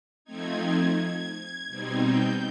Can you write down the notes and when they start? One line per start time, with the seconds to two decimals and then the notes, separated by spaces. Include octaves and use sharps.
0.25 F3 A3 C4 D#4 G#6
0.95 G#6
1.32 G#6
1.67 B2 G3 C4 D#4 G#6
2.03 G6